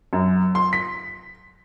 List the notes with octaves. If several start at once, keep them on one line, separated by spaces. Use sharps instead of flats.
F#2
C6
B6